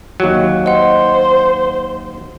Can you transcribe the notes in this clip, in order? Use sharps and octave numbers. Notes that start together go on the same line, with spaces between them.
D#2 F#3
C5 D#5 F#5